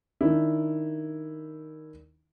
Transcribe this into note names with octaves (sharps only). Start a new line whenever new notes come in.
D#3 D4 E4